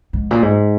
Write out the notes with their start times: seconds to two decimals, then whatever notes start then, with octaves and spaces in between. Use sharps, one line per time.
0.13 G#2
0.31 A#2
0.42 G#2